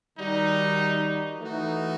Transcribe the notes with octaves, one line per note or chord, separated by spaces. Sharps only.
D#3 G3 D#4 F#4
E3 A3 D#4 F#4